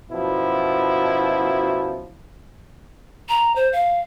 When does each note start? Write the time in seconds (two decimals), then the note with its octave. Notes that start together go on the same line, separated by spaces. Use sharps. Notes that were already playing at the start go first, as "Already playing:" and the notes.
0.11 F#2 B2 F3 E4
3.29 A#5
3.56 C5
3.73 F5